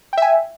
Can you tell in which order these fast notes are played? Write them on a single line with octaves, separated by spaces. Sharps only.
G5 E5 G#5